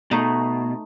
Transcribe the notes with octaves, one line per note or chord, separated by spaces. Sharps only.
B2 A3 D#4